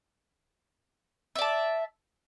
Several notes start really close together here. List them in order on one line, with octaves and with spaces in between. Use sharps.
E5 D5 A5